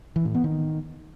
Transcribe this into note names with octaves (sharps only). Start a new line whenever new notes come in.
E3
A2
B3
D#3